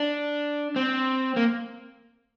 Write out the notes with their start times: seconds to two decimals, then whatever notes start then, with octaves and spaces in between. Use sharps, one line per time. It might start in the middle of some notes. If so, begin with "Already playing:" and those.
Already playing: D4
0.76 C4
1.36 A#3